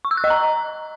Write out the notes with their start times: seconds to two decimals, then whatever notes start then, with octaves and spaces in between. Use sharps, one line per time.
0.05 C#6
0.11 E6
0.17 F#6
0.24 D#5
0.30 A#5